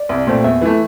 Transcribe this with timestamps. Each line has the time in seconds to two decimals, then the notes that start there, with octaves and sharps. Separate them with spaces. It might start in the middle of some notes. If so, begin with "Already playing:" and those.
Already playing: D5
0.09 C2
0.27 A#2 A3 C4
0.44 E2 E5
0.61 E3 A3